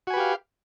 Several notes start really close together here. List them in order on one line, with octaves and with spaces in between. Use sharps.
F#4 G#5 B4 G4 F5